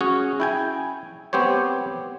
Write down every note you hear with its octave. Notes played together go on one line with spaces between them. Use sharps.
C#4 F#4 G#4 C#5
E4 G5 G#5
B3 C4 G4 C5 C#5